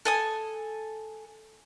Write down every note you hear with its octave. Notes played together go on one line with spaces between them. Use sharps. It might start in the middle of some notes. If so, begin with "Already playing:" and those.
A4 G#5 D#6